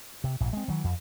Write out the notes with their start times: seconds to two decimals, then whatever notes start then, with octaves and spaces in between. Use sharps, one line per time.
0.24 C3
0.40 A#1 G#2
0.53 G#3 C4
0.68 D#3 E3 F#3
0.84 F2